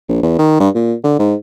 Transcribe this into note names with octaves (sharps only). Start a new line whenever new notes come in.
A#1
E2
D#3
G2
A#2
D3
G#2